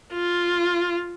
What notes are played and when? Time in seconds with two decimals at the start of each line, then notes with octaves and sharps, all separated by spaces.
0.13 F4